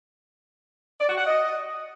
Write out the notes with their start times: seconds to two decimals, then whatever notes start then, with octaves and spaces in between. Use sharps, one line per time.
1.01 D5
1.09 F#4
1.18 F#5
1.27 D#5